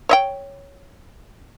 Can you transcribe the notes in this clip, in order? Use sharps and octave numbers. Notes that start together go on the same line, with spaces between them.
C#5 D#5 G5